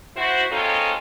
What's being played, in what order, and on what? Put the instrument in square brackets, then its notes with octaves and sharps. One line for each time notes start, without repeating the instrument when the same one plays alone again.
[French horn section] E4 F#4 C5
G#3 C4 D#4 F4 A4 C#5